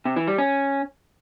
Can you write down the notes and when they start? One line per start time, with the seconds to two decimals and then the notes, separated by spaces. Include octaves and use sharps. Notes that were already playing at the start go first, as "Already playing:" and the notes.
0.05 C3
0.16 E3
0.27 G3
0.38 C#4